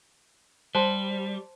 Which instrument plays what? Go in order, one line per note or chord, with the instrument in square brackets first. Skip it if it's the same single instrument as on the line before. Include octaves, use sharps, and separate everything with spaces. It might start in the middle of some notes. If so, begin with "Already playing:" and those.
[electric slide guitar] G3 [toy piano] C5 A5 C6